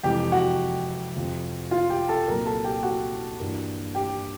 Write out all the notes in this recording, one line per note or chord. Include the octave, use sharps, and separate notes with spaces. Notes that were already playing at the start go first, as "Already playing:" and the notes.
F2 C3 E3 G#3 G4 G5
F#4 F#5
F2 C3 F3
F4 F5
G4 G5
A4 A5
C2 A#2 F#3 A#4 A#5
A4 A5
G4 G5
F#4 F#5
G2 E3 G3 A#3
G4 G5